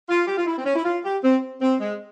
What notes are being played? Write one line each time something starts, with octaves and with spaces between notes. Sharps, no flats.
F4
G4
F4
E4
C4
C#4
E4
F4
G4
C4
C4
G#3